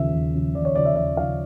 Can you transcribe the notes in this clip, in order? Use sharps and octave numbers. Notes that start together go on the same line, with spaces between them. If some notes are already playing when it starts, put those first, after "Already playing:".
Already playing: D#2 C#3 F3 E5
D#2
C#3 F3
D#2 D5
C#5
C#3 F3 D5
E5
D#2 E5
C#3 F3 F5